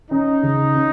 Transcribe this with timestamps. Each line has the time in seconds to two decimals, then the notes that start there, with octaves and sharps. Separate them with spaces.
0.11 C#4 D#4
0.43 C#3
0.75 C#4